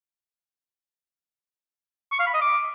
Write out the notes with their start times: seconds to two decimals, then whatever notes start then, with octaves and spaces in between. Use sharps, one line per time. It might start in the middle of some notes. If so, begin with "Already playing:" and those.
2.12 C#6
2.19 F5
2.27 B5
2.34 D#5
2.41 D6